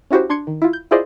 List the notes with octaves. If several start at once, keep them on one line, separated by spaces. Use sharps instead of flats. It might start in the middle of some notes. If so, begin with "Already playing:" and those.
C#4 E4 F#4 G4 C5
D4 C6 G#6 C#7
D#3
E4 F4
G6
E4 F4 G#4 C5 D5 D#5